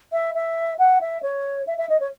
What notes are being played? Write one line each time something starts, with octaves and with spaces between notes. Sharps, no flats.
E5
E5
F#5
E5
C#5
E5
E5
D#5
C#5